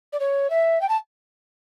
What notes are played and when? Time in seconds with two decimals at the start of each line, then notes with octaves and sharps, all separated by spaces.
0.13 D5
0.20 C#5
0.50 E5
0.81 G5
0.89 A5